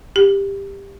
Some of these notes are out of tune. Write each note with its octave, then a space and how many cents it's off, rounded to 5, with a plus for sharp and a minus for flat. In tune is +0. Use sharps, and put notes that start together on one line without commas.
G4 +15